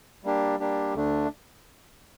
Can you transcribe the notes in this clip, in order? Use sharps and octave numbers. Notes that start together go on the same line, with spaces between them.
G3 A#3 D4 G4
G3 A#3 D4 G4
D2 D3 A3 D4